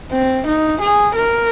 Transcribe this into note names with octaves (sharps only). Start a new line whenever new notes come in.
C4
D#4
G#4
A#4